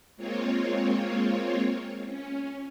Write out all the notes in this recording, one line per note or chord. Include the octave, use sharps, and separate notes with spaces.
G#3 A#3 C4 F4 C#5
C#4